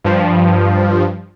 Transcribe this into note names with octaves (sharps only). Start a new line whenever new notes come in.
G2 F3